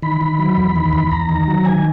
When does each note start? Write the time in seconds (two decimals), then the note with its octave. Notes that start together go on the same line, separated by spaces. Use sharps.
0.02 D#3 B5
0.21 D#3
0.39 F#3
0.57 E2
0.76 D#3
0.93 E2
1.12 E2 A#5
1.29 D#3
1.48 F#3
1.66 D#3 G#5